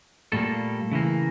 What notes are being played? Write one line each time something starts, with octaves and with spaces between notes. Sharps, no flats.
A#2 G3 A3 A#3 A4
C#3 E3 A#3